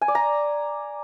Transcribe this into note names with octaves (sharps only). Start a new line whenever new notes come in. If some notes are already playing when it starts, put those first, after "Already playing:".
G#5
D5
A#5